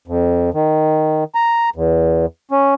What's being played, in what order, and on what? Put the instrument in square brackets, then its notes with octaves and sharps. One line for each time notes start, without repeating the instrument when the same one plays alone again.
[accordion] F2
D#3
A#5
E2
C#4